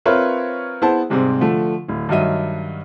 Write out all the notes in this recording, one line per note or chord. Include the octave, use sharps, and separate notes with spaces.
C4 F4 A#4 B4 C#5 E5
B3 E4 G#4 C5 A5
G#2 C3 G3 G#3 C4
D3 F3 A3
D1
G2 D#3 F#3 D#5 E5 D#7